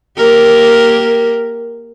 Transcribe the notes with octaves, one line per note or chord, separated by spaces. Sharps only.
A#3 G4 A#4